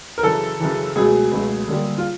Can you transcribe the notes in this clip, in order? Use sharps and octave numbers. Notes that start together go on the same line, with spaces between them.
A#4
F#2 C#3 E3 A4
F#2 C#3 E3
C#2 B2 F#3 A3 G#4
C#2 B2 F#3 A3
F#2 D3 G3 A#3
F4